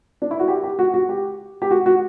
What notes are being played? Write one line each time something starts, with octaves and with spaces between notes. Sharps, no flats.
D4
E4
F#4
G4
G4
F#4
F#4
G4
G4
F#4
F#4